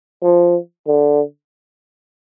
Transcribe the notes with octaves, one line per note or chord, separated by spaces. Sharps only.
F3
D3